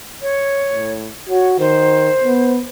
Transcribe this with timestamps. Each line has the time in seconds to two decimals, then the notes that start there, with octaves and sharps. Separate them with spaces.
0.22 C#5
0.70 A2
1.29 F#4 C#5
1.60 D#3 C5
2.23 B3